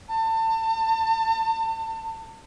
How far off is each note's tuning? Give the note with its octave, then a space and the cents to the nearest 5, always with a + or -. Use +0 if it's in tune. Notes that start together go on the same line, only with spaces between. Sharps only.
A5 +35